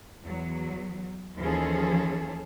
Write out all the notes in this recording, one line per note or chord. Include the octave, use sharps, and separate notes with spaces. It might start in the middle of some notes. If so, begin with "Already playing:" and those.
E2 F#3
D#2 E3 F3 C#4 G#4 A4